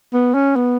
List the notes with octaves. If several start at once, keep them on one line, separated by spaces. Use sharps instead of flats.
B3
C#4
B3